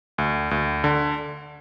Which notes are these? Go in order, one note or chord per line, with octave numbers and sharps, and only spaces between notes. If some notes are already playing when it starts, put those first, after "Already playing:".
D2
D2
D3